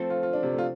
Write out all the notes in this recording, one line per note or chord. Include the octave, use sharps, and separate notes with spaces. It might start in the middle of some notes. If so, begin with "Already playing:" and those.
Already playing: F3 A3 C4 A4
F4
F4
D4
C3
A3
F4